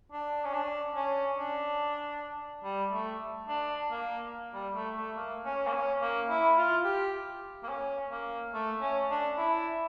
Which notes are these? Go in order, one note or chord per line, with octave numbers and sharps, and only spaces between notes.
D4
C#4
D4
C#4
D4
G3
A3
D4
A#3
G3
A3
A3
A#3
C#4
A#3
C#4
A#3
E4
F4
G4
A#3
C#4
A#3
A3
C#4
D4
E4